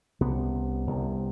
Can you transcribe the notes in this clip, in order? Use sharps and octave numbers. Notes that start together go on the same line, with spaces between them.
C2 C3 B3 C#4
C2 C3